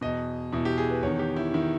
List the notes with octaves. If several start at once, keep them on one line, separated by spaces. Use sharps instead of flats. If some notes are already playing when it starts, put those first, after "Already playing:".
E2 B2 D#5
E2 B2 E4
G4
G#4
B4
E2 D#3 C#5
G4
E4
D#3 E4